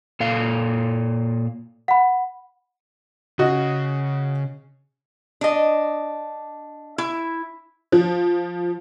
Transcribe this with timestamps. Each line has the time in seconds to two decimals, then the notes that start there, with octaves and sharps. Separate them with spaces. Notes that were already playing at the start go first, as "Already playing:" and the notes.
0.20 A#2 A4 F5
1.88 F#5 B5
3.39 C#3 F#4 D#5
5.41 D4 D#5
6.98 E4
7.92 F3